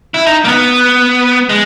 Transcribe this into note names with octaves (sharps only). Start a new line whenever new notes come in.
E4
D#4
A#3
B3
G#3